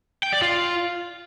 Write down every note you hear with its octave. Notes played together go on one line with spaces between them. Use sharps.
G5
D5
F4